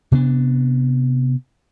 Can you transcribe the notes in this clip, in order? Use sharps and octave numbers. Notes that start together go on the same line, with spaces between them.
C3 B3 D4